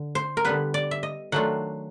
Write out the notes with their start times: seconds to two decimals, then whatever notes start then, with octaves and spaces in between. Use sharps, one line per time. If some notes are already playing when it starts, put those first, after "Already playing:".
Already playing: D3
0.15 C5
0.37 A#4
0.45 D3 G3 B3 B4
0.74 D5
0.91 E5
1.03 D#5
1.32 D#3 F#3 A3 D4 F4 F#5